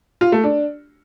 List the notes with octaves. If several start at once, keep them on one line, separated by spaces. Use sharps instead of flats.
F4
A3
D4